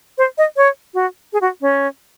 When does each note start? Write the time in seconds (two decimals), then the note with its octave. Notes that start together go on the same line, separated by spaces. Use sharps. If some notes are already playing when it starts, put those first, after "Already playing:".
0.18 C5
0.38 D#5
0.57 C#5
0.94 F#4
1.33 G#4
1.41 F#4
1.62 C#4